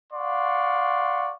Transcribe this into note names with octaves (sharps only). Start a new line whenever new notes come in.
D5 F5 F#5 C6 C#6